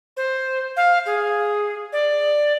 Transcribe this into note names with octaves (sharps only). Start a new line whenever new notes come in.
C5
F5
G#4
D5